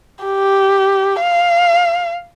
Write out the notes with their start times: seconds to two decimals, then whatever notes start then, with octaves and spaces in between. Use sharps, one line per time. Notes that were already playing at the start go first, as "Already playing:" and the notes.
0.25 G4
1.21 F5